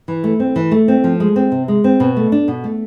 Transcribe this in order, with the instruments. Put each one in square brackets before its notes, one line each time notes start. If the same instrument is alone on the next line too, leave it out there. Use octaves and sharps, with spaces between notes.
[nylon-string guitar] E3
A3
C4
E3
A3
C4
F3
G#3
C4
C3
G#3
C4
B2
A3
D4
B2
A3